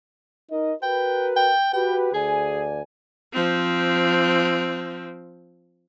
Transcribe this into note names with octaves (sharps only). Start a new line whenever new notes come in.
D#4 A#4 D#5
F#4 A#4 B4 G5
G5
F#4 G4 B4 G5
D2 G#4 D5 G#5
F3 C4